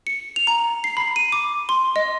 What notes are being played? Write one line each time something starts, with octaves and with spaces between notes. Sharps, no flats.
C#7
F7
A#5
C7
B5
D#7
D6
C6
D#5